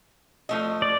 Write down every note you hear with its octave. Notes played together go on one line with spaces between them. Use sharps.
F3 A3 D#5
D5